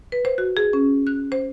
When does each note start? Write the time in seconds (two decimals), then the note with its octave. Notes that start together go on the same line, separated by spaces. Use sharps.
0.12 B4
0.25 C5
0.38 F#4
0.57 G#4
0.73 C#4
1.07 F#6
1.32 C5